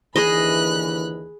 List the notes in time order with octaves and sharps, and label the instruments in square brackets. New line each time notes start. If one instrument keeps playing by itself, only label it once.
[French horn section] D#2 D3 E3 [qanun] G#4 D#5 [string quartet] B5 F#6